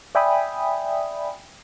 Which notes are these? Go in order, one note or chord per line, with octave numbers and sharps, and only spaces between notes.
D5 E5 G5 G#5 B5 D#6